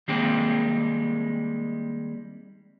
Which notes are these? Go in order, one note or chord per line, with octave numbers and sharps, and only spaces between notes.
D#3 G3 G#3 A#3 C4